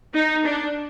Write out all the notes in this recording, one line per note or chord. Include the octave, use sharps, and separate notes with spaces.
D#4
D4